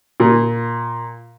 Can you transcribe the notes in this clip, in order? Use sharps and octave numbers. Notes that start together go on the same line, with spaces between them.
A#2